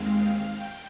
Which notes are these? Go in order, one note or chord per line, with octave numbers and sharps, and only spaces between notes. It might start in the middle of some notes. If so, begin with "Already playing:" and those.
Already playing: D#2 D#3 G#3 C4 F5
G5